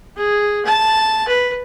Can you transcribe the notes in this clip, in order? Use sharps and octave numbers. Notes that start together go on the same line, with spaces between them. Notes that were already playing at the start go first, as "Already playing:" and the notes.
G#4
A5
B4